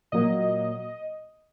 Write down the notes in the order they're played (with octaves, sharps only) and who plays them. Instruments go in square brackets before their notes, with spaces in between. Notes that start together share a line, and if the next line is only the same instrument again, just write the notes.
[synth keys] A#2 F#3 A#3 D#5